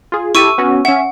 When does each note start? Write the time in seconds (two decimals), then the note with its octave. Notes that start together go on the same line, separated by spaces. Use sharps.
0.12 F4 G#4
0.35 E4 G4 A4 C#6 E6 D#7
0.58 B3 C#4 F#4
0.85 C#4 E5 F#5